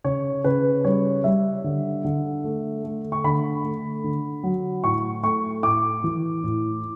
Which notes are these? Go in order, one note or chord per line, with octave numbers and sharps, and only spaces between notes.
C#3 C#5
C#3 B4
G3 C#5
G3 E5
D3
D3
A3
A3
C#6
D3 B5
A3
D3
F#3
A2 C#6
A3 C#6
A2 D6
E3
A2